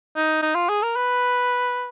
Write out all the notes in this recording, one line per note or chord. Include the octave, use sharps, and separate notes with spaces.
D#4
D#4
F4
G#4
A#4
B4